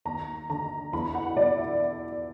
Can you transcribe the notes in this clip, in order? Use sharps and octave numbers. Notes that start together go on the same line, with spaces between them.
D#2 A#5
D3 A#5
E2 B5
F#5
B2 D5
E5